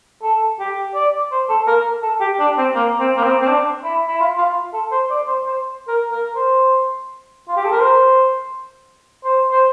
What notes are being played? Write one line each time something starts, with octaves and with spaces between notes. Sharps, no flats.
A4
G4
D5
C5
A4
A#4
A4
G4
D4
C4
A#3
C4
A#3
C4
C4
D4
E4
E4
F4
F4
A4
C5
D5
C5
C5
A#4
A#4
C5
F4
G4
A4
A#4
C5
C5
C5